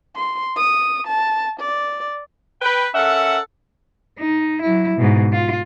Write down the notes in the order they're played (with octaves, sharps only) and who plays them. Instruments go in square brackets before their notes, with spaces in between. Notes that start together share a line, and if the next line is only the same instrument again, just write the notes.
[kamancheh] C6
D#6
A5
D5
[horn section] B4 G5
C#4 A4 A#4 E5 F#5
[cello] D#4
F#3 E4
G#2 B2
F4